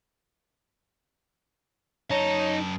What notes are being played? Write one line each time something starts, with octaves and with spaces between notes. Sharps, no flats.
F#2 D#4 C#5 A5